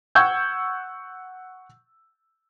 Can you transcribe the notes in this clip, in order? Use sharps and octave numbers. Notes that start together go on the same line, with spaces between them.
F#5 C#6 E6 G6 G#6